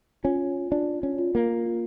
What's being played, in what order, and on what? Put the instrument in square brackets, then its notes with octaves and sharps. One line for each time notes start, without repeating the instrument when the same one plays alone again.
[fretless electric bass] C#4 [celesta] F4
[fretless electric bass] D4 [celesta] F4
[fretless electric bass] C#4
[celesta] F4
[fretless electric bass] A#3
[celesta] F4